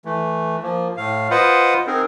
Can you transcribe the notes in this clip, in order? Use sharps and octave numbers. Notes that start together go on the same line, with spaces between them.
E3 A3
F3 A#3
A2 F5
F4 B4 C5 D#5 F#5
C4 D#4 G#4 A#4